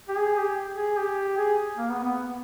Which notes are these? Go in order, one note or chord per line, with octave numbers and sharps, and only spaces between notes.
G4
G#4
G4
G#4
G4
G#4
A#3
B3
B3